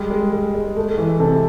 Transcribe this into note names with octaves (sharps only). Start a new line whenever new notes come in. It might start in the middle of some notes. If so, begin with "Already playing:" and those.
Already playing: G3 G#3
G#3
G#3
G#3
A3
E3
C3 A4